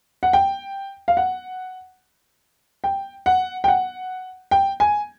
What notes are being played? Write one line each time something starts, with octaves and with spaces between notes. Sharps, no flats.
F#5
G5
F5
F#5
G5
F#5
G5
F#5
G5
G#5